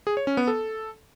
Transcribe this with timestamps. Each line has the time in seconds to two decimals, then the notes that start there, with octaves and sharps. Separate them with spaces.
0.07 G#4
0.17 C#5
0.27 C#4
0.37 B3
0.48 A4